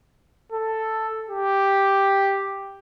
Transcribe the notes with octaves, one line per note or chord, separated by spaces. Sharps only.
A4
G4